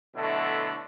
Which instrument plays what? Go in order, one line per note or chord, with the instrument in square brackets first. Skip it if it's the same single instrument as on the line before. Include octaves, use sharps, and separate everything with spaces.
[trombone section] B2 D3 F#3 A3 E4